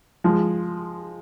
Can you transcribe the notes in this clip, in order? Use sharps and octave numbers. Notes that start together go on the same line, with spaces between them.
F3 G#3